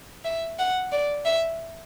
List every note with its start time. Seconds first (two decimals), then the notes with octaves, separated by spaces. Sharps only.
0.25 E5
0.59 F#5
0.92 D5
1.25 E5